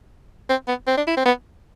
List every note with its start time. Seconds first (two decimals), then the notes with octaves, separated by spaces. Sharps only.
0.49 C4
0.67 B3
0.87 C4
0.97 D4
1.07 E4
1.17 C4
1.26 B3